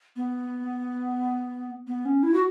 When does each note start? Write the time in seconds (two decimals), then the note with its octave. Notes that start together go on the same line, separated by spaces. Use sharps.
0.16 B3
1.87 B3
2.05 C#4
2.23 E4
2.34 F#4